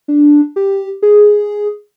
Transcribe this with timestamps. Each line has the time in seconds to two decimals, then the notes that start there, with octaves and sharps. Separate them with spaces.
0.08 D4
0.56 G4
1.02 G#4